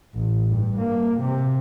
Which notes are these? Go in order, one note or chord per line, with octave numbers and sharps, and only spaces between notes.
A1
G2
A#3
C3